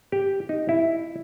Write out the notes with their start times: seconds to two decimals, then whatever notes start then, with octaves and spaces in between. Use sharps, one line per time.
0.12 G4
0.49 D#4
0.69 E4